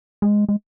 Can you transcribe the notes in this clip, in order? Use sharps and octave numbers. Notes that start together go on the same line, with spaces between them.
G#3
G#3